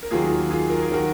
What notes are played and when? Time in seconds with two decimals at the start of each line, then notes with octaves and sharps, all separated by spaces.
0.03 A#4
0.11 D#2 D#3 F#3 F4 G#4
0.51 F4 G#4
0.70 A#4
0.82 G#4
0.90 D#3 F#3 F#4 A#4